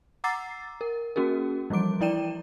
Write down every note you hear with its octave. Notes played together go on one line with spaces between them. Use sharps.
F#5 A#5 D6 E6 A6 C7
A#4
A#3 C#4 F#4 G#4 A#4
E3 F3 G3 D6 D7
F3 E4 D5 G5 D#7 E7